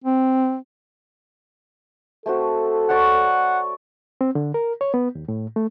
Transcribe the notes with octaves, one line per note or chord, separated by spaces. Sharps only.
C4
A3 C4 F#4 A4
C#5 D5 F#5 C#6
C4
D3
A#4
C#5
B3
D#2
A2
A3